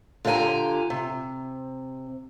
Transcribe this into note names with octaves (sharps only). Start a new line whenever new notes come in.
D3 F4 G4 F5 G#5 A#5
C3